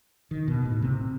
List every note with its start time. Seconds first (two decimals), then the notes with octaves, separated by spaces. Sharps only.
0.31 D#3
0.48 B2
0.66 A2
0.82 C3